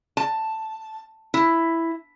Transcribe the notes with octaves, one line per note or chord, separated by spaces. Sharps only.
A5
E4